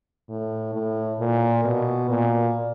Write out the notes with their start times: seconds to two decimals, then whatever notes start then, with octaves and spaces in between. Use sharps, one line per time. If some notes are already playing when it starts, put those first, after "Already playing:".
0.29 A2
0.74 A2
1.19 A#2
1.64 B2
2.09 A#2